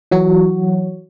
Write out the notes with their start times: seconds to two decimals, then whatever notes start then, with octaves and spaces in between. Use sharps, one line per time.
0.11 E3 F#3 F#4 C#5